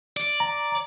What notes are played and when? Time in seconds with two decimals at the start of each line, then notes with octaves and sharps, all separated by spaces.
0.17 D5
0.40 A#5